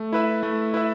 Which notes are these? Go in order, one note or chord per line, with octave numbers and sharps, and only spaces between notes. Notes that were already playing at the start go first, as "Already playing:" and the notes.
Already playing: A3
E4 B4 E5
A3
E4 B4 E5